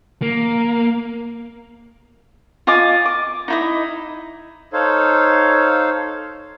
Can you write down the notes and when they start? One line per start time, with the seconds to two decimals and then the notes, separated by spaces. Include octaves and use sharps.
0.22 A#3
2.67 F4 D#5 G#5 D6
3.06 D6
3.48 D#4 E4 D#5
4.73 D#4 A4 C5 C#5 F5